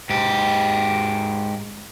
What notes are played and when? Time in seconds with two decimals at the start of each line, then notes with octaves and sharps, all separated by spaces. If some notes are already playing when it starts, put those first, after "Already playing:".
0.10 G#2 G4